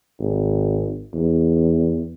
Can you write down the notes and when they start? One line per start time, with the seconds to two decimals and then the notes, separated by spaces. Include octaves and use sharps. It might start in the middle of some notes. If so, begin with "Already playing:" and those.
0.20 G#1
1.14 E2